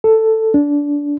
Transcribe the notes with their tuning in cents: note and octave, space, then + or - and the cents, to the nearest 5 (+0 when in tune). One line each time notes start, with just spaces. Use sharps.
A4 +10
D4 -20